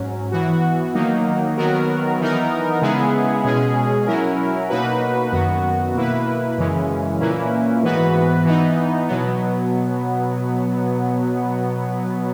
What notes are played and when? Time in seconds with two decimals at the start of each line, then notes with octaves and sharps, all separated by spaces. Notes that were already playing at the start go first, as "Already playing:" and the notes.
Already playing: G#2 F#3 C#4
0.32 E3 B3 F#4
0.94 D#3 F#3 A#3 D#4
1.57 D#3 F#3 B3 F#4 A#4
2.19 E3 B3 D#4 A#4
2.81 C#3 G#3 B3 E4 G#4
3.44 B2 G#3 C#4 G#4
4.07 F#3 C#4 E4 A#4
4.69 B2 A#3 D#4 F#4 B4
5.32 F#2 D#3 F#3 B3 F#4
5.95 B2 A#3 E4 B4
6.58 F#2 C#3 E3 G#3 C#4
7.20 A#2 A#3 C#4 E4 B4
7.82 G#2 E3 B3 F#4 B4
8.45 E3 B3 D#4
9.08 B2 F#3 B3